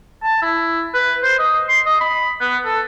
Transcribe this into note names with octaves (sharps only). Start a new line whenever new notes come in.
A5
E4
B4
C5
D#5
C6
D#5
B5
B3
A4